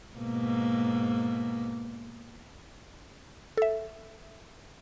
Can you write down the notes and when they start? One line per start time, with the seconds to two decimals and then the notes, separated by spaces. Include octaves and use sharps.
0.16 G#2 B2 A#3
3.57 A4 E5